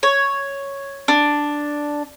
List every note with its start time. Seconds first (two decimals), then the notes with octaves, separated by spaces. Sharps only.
0.03 C#5
1.08 D4